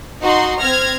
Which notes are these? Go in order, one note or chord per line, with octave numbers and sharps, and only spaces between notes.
D#4 F#4 C6
C4 F6 G#6 A#6